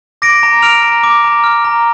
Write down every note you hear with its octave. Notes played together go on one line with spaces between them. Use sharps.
D6 A#6 D7
A#5
F6 D7 F7
A#5
D6
A#5
F6
A#5